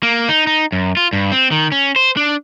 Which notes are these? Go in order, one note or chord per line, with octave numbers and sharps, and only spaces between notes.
A#3
D#4
D#4
F#2
F4
G2
C4
D#3
C#4
C5
D4